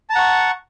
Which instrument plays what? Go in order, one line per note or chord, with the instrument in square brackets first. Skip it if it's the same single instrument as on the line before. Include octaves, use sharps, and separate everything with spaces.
[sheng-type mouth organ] A5
A#5
F#5
C#6